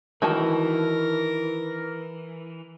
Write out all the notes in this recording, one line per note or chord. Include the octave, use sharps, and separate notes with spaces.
D#3 E3 F#4 A#4 A5